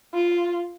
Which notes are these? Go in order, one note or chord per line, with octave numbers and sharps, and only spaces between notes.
F4